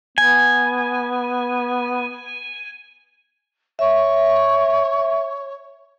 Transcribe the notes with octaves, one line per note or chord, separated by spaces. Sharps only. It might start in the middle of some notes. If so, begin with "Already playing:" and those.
B3 G#5
C#5 E5